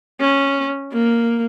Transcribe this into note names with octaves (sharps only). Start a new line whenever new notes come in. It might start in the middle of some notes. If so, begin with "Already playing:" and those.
C#4
A#3